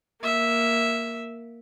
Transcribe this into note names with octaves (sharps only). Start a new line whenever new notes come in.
A#3 E5